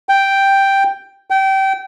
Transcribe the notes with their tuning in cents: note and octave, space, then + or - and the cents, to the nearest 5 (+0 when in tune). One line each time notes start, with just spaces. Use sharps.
G5 +0
G5 -25